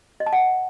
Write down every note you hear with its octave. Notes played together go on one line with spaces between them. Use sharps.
D#5
A5
F#5